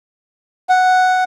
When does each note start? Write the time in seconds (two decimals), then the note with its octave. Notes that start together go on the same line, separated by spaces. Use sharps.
0.69 F#5